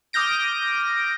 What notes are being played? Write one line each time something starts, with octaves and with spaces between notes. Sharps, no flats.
D6 D#6 F6 G6 A#6 D7